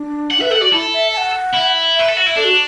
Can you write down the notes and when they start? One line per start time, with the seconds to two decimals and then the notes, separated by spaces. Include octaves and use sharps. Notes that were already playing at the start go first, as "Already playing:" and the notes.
Already playing: D4
0.31 F#5
0.40 B4 E5
0.51 A4 F#5
0.61 F#4 D5
0.73 E4 A4
0.93 E5
1.13 A5
1.17 F#5
1.54 E4
1.95 B4 E5
2.08 A4
2.17 F#4
2.26 E4
2.36 D4 A4
2.45 F#4